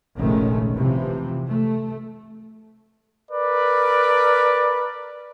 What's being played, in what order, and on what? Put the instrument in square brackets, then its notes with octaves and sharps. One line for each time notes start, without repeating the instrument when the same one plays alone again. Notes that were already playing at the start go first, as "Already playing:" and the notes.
[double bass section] F1 A#1 D#3 G#3 A3 C#4
C3 E3 F3
A3
[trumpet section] A#4 B4 D5